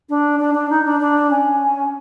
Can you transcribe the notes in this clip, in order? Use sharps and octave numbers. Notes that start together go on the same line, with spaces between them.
D4
D4
D4
D#4
D4
D4
C#4